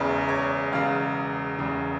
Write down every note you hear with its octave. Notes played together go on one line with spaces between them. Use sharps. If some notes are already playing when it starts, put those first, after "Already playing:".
Already playing: E1 E2 C#3
C#5
E1 E2 C#3 F5
E1 E2 C#3